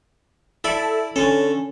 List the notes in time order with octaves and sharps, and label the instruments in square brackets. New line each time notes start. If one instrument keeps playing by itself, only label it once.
[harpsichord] E4 D5 [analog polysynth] A4 E5
[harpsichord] D3 A4 [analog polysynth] C#4